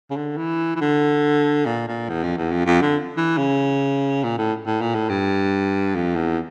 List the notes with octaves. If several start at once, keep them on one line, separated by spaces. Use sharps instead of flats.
C#3
D3
E3
E3
D3
A#2
A#2
E2
F2
E2
F2
F2
D3
E3
C#3
A#2
A2
A2
A#2
A2
G2
F2
E2